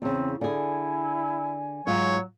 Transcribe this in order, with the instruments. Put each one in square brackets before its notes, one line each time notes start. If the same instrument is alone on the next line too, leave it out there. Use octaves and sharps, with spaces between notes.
[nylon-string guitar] E2 C#3 [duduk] C4
[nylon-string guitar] D3 G#4 [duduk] E4 [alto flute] G#5
[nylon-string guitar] G#2 F4 [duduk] F#3 [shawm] C#5